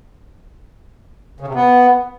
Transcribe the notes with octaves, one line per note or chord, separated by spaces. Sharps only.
C#3
C3
B3